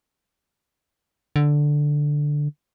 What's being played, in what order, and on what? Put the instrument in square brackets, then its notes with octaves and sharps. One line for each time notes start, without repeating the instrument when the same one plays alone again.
[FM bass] D3